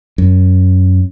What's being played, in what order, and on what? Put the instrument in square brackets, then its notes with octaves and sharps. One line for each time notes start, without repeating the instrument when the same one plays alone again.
[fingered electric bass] F#2